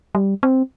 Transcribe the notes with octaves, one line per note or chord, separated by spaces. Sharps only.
G3
C4